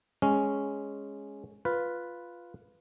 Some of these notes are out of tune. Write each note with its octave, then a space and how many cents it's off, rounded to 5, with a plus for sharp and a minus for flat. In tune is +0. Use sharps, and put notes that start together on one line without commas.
G#3 +0 C#4 +0
F4 +0 B4 +0